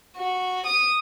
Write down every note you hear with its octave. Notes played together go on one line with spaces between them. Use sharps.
F#4
D#6